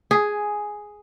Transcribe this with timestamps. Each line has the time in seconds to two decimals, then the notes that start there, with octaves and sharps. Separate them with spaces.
0.11 G#4